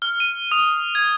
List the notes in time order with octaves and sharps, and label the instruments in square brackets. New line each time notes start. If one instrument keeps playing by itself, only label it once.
[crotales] F6
D#7
D#6
G#6